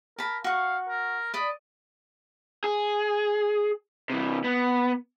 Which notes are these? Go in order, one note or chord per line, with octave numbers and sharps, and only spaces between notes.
A#4 A5 B5
F#4 F5 C#6
A#4
D5 D#5 B5 D#6
G#4
C3 E3
B3